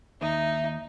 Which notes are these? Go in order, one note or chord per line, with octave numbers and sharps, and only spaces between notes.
D#2 D#4 D#5 E5